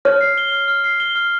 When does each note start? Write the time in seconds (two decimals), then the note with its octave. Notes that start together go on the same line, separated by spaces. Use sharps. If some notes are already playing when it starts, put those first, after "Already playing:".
0.05 C#5 F6
0.21 C7
0.38 G7
0.52 F6
0.68 F6
0.84 C7
1.00 G7
1.16 F6